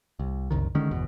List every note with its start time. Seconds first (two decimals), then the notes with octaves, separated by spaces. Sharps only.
0.19 C2
0.51 F#1 C2 D#3
0.75 D3 D#3 G#3 C#4
0.91 G1 E2 B2